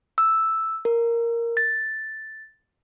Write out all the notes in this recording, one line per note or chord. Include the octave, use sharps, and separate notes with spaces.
E6
A#4
A6